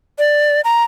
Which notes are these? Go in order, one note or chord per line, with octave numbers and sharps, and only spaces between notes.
D5
A#5